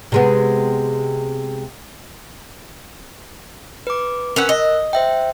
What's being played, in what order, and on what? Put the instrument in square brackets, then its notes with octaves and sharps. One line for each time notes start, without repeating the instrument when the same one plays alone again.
[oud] C3 G#3 B3
[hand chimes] B4 D6
[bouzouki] C#4 B4 F#5 [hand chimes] A#4 E6 F#6
[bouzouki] D#5
[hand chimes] C5 E5 G5